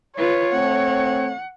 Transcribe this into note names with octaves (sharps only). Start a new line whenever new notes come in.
F4 B4 C#5
A3 C4 F#5